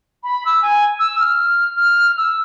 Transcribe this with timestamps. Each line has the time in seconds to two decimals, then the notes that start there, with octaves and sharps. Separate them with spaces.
0.24 B5
0.45 E6
0.62 G#5
0.99 E6
1.20 F6
1.76 F6
2.18 E6